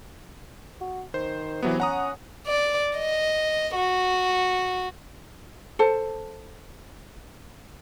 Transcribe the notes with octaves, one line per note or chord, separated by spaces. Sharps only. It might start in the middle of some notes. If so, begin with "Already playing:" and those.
F#4
D#3 C5
C3 E3 F#3 B3
C#4 F#5 A#5 D#6
D5
D#5
F#4
A4 C5 A5